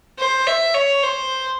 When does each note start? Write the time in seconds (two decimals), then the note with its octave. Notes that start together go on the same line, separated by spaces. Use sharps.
0.19 C5
0.47 E5
0.74 C#5
1.03 C5